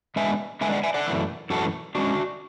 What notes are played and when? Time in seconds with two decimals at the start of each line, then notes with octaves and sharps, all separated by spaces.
0.16 D3 G#3 B3 D4 E5 G#5
0.61 D3 G#3 B3 D4 E5 G#5
0.72 D5 F#5
0.84 E5 G#5
0.94 D5 F#5
1.07 F#2 E3 A3
1.50 F#2 E3 A3 F#4 A4
1.95 A2 G#3 C#4 D4 F#4